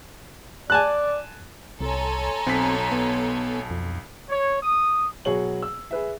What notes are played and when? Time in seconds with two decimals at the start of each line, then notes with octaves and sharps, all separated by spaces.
0.70 D5 G#5 A5 F#6
1.80 C2 A4 C#5 G#5 A#5 C6
2.47 B1 C4 B6
2.92 B3
3.71 F2
4.30 C#5
4.63 D#6
5.25 B2 F#3 G#4 C#5 F#7
5.62 E6
5.91 G#4 B4 E5